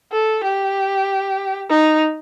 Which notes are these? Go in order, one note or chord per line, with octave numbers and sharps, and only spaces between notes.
A4
G4
D#4